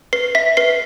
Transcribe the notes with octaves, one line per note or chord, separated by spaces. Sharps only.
B4 C7
E5 B6
B4 C7